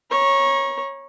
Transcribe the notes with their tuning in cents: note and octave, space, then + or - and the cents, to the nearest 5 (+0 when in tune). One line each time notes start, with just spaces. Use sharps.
C#5 -15 A#5 +30